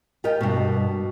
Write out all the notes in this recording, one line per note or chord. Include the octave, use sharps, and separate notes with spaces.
F4 G4 A#4 D#5 G5
G2 B2